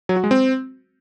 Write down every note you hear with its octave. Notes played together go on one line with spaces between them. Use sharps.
F#3
F#4
G#3
C4